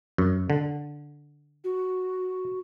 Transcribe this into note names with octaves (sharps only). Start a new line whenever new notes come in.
F#2
D3
F#4